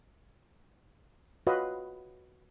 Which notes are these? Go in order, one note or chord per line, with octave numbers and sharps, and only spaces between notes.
F4 F#4 B4 C#5 D#5 F5